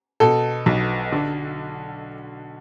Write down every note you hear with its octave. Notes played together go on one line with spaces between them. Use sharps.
B2 A4
B1
D3